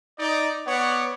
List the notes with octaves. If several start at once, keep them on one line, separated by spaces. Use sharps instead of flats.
D#4 D5
B3 C#5 D5 F#5